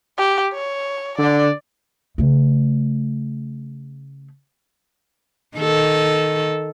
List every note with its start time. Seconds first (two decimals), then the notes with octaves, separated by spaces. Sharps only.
0.18 G4
0.53 C#5
1.18 D3 D5
2.18 C#3 A3
5.58 D#3 A4